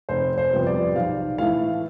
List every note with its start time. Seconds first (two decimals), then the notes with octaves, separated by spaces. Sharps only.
0.09 F1 C5
0.38 C5
0.52 F2 C3 G3 B3
0.67 D5
0.95 B1 F5
1.38 A2 E3 A3 F5